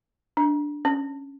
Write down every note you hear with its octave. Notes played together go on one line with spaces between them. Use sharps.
D4
C#4